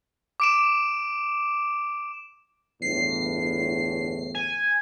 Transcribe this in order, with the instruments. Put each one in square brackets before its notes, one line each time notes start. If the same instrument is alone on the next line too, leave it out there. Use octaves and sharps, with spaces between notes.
[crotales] D6 D7 E7
[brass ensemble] G1 E2 A2 [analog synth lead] C7
[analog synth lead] G#5